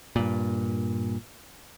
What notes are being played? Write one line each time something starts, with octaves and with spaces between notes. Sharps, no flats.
G2 A#2